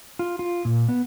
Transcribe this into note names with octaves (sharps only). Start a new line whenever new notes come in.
F4
F4
A#2
B3